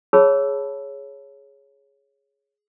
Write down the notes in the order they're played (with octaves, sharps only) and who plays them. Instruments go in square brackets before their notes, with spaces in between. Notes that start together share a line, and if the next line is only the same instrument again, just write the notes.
[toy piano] G#4 C#5 A5 B5 E6